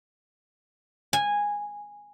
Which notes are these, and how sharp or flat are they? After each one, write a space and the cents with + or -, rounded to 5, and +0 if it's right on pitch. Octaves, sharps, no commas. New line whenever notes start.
G#5 -10